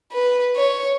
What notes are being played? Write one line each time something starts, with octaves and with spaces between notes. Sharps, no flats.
B4
C#5